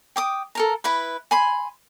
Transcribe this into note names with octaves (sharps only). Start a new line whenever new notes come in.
G5 D6 D#6
A4 A#4 A#5
E4 B4 B5
G#5 B5 C6